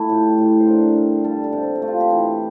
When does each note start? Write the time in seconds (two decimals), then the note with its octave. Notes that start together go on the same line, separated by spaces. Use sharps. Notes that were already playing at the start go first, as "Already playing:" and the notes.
Already playing: A3 E4
0.09 A2 G4
0.38 A2
0.59 C5
0.67 D3 A#4
0.96 G2
1.24 G3 A4
1.44 A4
1.52 C3
1.63 A4
1.75 G4
1.82 A3
1.88 F4
2.00 G4
2.10 E3